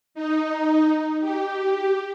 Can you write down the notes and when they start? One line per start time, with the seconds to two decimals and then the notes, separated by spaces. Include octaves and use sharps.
0.15 D#4
1.21 G4